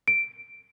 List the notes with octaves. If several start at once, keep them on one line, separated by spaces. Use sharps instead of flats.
D7